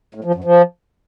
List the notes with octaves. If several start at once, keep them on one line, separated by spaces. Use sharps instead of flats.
A2
F3
F#2
F3